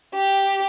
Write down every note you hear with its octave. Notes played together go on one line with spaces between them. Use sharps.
G4